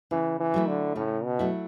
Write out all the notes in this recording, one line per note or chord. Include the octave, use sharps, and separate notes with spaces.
C#3 E3
E3
F#3 A3 E4
D3
A2 C#3
B2
F#3 A3 E4